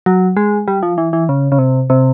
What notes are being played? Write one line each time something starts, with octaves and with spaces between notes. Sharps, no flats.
F#3
G#3
G3
F3
E3
E3
C#3
C#3
C3
C3